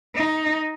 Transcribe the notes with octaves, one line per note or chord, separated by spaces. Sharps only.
D#4